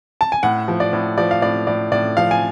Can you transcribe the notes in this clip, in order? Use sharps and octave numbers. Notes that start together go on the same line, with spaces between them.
A5
G#5
A2 F#5
F3
D5
A2
F3 D5
F5
A2 D5
A2 D5
A2 D5
F3 F5
G#5